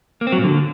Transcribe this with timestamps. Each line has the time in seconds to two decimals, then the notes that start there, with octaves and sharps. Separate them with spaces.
0.21 A#3
0.27 C4
0.32 F#3
0.38 A#2
0.44 D3